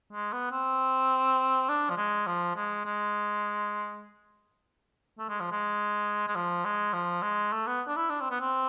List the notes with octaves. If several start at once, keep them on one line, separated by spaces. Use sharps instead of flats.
G#3
B3
C4
D4
F3
G#3
F3
G#3
G#3
A3
G#3
F3
G#3
G#3
F3
G#3
F3
G#3
A3
B3
D4
E4
D4
C4
B3
C4